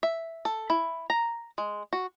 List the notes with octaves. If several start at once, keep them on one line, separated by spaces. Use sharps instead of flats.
E5
A4
E4
A#5
G#3
F#4